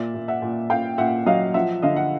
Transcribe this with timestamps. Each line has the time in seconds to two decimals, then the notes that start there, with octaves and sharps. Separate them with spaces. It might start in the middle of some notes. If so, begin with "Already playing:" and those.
Already playing: A#2 D5 E5
0.14 A#2
0.28 E5 F#5
0.42 A#2
0.70 A#2 F5 G5
0.98 A#2 E5 F#5
1.26 F#3 D#5 F5
1.54 F3 E5 F#5
1.82 D3 D#5 F5
1.96 F#5